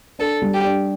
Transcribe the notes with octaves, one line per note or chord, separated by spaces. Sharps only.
D4 A4
G3
G4
D4